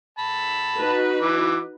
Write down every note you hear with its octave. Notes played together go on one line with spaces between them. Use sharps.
A5 B5
D#4 F#4 B4
E3 D6